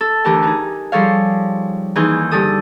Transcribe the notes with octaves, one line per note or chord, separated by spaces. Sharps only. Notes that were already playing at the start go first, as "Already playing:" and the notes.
A4
D2 E3 G4 A#4 A5
D#4 G#4
F3 G3 G#4 A4 C#5 F5
D#2 E3 D#4 G#4 C6 G6
G2 D3 A4 D#6